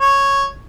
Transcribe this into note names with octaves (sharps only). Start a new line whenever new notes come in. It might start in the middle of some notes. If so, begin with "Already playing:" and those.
C#5